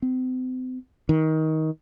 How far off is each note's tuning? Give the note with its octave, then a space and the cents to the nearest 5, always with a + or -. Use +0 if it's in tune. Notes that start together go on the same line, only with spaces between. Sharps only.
C4 -40
D#3 +20